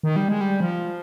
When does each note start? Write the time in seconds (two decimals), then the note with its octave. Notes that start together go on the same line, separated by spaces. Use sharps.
0.03 D#3
0.16 G3
0.28 G#3
0.41 G3
0.60 F3